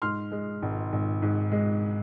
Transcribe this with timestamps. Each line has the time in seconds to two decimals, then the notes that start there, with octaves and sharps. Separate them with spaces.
0.02 G#2 C6 F6
0.31 G#3
0.62 G#1
0.93 G#1
1.22 G#2
1.52 G#3